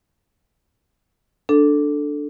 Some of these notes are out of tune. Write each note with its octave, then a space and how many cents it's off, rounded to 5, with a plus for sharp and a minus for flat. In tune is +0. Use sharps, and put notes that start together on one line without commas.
D4 +0 A4 +0